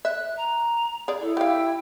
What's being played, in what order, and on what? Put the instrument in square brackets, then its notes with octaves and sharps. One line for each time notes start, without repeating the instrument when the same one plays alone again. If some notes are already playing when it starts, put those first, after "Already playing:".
[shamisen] E5 [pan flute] F#6
[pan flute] A#5
[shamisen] G#4 D5
[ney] E4 [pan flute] A4
[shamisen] G4 F5 [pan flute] G5